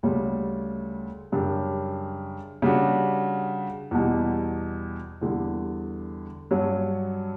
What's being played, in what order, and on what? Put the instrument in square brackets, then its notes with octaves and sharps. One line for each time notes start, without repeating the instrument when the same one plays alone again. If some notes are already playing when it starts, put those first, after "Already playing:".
[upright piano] D2 C#3 G3 C#4
F#2 C#3 G3 D4 G4
C#3 G3 D4 F#4
E2 B2 G3
E2 D3 G3
G2 F#3 C#4